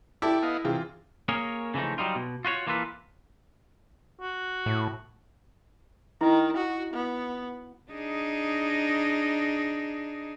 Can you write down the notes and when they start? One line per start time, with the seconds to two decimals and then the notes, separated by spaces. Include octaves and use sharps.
0.22 E4 G4 A4 D5 A5
0.43 B3 D#5 F5
0.64 C3 E3 F4 G#4
1.29 A#3 C#4 G#4 A#4 C#5
1.74 C#3 E3 F3 A3 D#4
1.98 F#3 G3 D#4 F4
2.15 B2
2.45 F4 F#4 B4 C#5
2.67 E3 A#3 F4 A4 B4
4.21 F#4
4.66 A2
6.21 D#3 E4
6.57 F#4
6.94 B3
7.91 D4 D#4 G#4